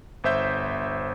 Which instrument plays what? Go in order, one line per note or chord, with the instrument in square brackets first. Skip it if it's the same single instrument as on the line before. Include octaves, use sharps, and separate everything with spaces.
[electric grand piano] G1 C5 E5 G6